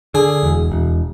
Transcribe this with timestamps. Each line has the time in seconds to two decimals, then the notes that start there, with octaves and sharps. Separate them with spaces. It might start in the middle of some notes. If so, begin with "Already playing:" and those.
0.14 D3 G#4
0.43 E1
0.72 E1